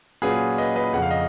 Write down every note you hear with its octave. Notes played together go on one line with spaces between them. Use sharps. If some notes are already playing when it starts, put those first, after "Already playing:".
A#2 F#3 C#4 F4 G#4 B4
B4 D#5
B4 D#5
F2 C#3 F3 F#5
F5
D#5